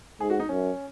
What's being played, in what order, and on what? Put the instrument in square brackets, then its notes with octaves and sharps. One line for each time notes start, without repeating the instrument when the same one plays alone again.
[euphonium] G#2 [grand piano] G#4
[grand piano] F#4
D#4
[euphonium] F#2 [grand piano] C#4